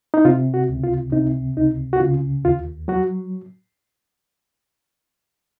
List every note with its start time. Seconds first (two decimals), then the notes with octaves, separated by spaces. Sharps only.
0.14 D#4
0.25 C3 F4
0.54 F#4
0.69 C#2
0.84 F4
1.12 C3 D#4
1.56 C#2 D#4
1.93 F#4
2.00 C#3 F4
2.44 D#2 F4
2.88 F#3 F#4